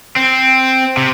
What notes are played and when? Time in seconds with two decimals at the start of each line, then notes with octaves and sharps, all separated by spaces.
0.16 C4
0.97 C3